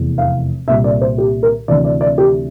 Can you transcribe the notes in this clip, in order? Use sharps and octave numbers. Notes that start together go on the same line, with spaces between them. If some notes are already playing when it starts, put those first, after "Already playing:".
Already playing: F1 E2 E3
F5
C2 A#2 G3 E5
D5
C5
G4
A#4
D2 C3 E3 D5
D5
D5
G4